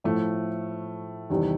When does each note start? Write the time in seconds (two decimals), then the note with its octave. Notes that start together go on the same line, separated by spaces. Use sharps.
0.04 A2 F3 A3
1.30 E2 C3 D#3 G3